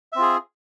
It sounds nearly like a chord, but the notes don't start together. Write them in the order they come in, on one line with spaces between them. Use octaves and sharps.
E5 C4 F4 G#4